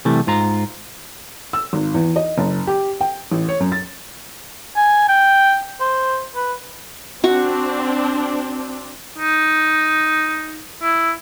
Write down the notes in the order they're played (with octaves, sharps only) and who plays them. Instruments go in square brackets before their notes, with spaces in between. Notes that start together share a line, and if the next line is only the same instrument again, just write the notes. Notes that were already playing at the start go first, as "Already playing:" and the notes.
[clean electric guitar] C3 E3 G3 A3
G#2 F4 A#5
[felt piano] E6
G#1
E2
D#5
F#1
G4
G5
A1
C#5
F#2
A6
[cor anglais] G#5
G5
C5
B4
[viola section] C4 D4 [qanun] F#4 C#6
[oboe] D#4
E4